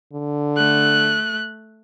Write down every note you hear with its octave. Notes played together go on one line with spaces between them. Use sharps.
D3
A3 F#6